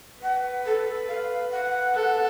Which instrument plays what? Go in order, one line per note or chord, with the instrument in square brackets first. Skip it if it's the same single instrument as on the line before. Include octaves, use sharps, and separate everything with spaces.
[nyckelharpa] B4 [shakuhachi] F#5
[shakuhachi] A4
F5
F#5
[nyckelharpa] A4